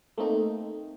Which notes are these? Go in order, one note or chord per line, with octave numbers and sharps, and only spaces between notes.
A3 A#3 C4 D#4